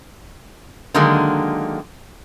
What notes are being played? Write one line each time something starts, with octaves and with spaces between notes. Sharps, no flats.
D3 D#3 F#3 G#3 A#3